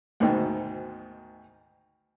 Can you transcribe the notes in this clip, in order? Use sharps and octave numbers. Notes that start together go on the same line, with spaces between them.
D2 G#2 B2 D#3